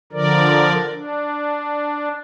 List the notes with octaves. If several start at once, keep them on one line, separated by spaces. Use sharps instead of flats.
D3 F3 A#4 D5
D4